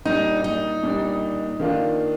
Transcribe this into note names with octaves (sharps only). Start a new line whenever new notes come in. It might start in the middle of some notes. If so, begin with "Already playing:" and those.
A#2 G3 D4 D#4
D#4
A#2 G3 D4
D#3 A#3 D4 F4